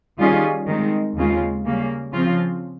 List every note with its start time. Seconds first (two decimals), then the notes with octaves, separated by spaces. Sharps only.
0.19 D#3 G3 C#4 F4 G#4
0.67 D#3 G#3 C4
1.16 D#2 C#3 G#3 C4 F4
1.65 C#3 G3 A#3
2.12 C#3 F3 C4 F4